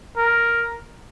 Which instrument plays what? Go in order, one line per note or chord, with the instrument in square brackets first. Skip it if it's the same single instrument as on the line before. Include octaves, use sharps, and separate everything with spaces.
[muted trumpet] A#4